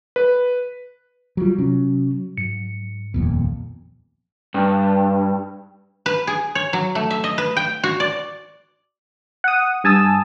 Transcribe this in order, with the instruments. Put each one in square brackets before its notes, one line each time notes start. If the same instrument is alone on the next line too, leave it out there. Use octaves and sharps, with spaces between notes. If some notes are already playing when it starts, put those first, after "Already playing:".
[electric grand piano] B4
[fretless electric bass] F#3 G3 [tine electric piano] F4 F#4
[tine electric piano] C3 C#4 [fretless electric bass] F#3
[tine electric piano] G#2 C#7
[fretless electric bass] D#1 F2 A#2 [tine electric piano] C2 B3
[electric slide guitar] G2
[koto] B4
G#4
C#5
F#3
A3
E5
D#5
B4
G5
F#4
D5
[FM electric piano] F#5 D#6
G2 G#5 A5 D#6 E6